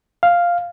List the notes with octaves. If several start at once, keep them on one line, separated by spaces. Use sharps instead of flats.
F5